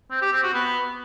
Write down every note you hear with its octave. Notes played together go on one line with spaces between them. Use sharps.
C4
G4
C4
F#4
B3